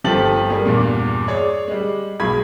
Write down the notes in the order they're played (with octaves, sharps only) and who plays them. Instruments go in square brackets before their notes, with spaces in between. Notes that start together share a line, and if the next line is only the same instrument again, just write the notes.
[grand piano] G1 F3 G4 A4 A6 F#7
G3 A#3 G#4
E2 G2 A#2
G#4 C#5 D5
G3 G#3
B1 G#3 G#4 B5 G#6